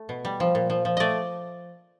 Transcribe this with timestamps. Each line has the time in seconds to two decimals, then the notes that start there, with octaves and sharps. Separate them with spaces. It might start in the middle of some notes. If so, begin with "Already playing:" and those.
Already playing: A3
0.09 B2
0.25 G3
0.40 F3
0.55 A#2
0.70 F3
0.85 F3
0.97 A3 D5 D#5